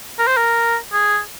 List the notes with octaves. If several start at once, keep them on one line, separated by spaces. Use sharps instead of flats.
A#4
C5
A#4
G#4